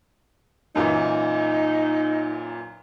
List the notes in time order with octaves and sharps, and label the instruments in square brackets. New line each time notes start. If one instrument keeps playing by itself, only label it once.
[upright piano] F#2 A#2 E3 [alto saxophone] D#4